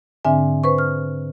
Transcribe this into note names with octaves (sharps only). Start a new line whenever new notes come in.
G#2 D3 C4 D4 E5 G#5
B4 C5 C#6
F6